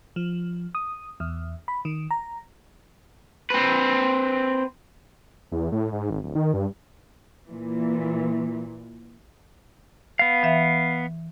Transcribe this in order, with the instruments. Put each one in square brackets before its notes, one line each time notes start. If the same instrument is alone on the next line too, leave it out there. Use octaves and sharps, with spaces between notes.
[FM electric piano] F3
D#6
E2
B5
D#3
A#5
[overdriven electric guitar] C4 B4
[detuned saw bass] E2
A2
G#2
G#1
D1
D#3
G2
[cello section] A#2 E3
[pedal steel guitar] B3 F5
[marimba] E3 E5